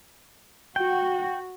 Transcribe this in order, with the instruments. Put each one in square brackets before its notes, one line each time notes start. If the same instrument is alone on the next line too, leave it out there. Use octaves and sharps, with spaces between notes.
[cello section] F#4 [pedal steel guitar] G5